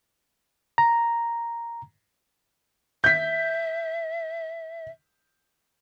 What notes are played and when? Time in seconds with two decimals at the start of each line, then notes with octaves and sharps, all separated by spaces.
0.78 A#5
3.04 E5 G6 B6